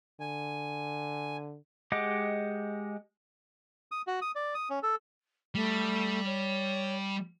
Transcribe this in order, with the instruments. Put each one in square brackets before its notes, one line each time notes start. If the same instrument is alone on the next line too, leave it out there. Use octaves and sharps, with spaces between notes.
[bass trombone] D3 [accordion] G#5
[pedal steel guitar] G#3 G4 D#5 F#5 D6
[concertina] D#6
F#4
D#6
D5
D#6
C#4
A4
[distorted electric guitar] G3 [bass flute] A3
[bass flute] C#5